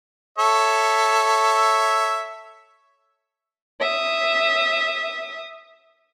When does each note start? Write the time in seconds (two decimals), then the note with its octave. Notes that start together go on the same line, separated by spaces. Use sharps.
0.38 A4 C#5 E5
3.81 E5 D#6